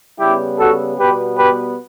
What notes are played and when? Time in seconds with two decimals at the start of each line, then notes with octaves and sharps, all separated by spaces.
0.19 C#3 G3 B3 E4 G4
0.59 F#4 A4
0.98 B2 G3 B3 G4 B4
1.37 G4 B4